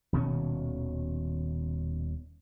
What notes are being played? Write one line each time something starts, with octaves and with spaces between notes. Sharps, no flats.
D#1 B2 D#3 C#4